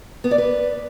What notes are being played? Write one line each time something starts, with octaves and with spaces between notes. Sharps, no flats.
B3
D5
B4